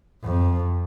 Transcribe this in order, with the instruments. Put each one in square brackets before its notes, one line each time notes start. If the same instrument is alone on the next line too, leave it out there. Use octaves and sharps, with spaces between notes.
[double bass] F2